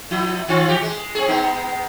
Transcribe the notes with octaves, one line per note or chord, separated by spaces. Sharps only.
F3 E4
D#3 C4 F4
E3 G4
G#3
C4 G#4
G#3 B3 D#4